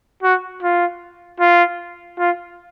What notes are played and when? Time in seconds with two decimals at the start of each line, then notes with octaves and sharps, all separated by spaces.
0.23 F#4
0.62 F4
1.40 F4
2.19 F4